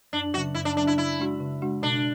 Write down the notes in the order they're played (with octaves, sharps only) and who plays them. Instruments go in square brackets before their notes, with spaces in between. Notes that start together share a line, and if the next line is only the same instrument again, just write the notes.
[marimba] F#2 [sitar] D4
[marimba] C#3 F#3 C#4 [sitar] F#4
[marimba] F#2 [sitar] E4
[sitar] D4
[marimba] C#3 F#3 C#4 [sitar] D4
[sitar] E4
[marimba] C#3 [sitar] E4
[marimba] G#3 D4 F#4
C#3
G#3 D4 F#4
[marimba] B2 [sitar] D4